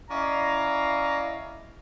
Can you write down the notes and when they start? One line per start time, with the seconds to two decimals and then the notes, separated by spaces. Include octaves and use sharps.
0.11 C#4 E4 D5 D#5 F5 A#5